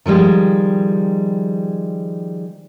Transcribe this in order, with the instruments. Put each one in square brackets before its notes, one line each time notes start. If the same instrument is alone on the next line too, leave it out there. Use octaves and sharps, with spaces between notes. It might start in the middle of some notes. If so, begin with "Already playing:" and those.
[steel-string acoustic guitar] D#3 F3 G3 G#3